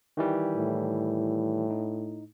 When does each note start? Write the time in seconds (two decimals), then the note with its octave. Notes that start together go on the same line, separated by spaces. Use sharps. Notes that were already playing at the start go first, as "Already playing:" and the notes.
0.17 D#3 E3 G3
0.56 A2
1.70 D#4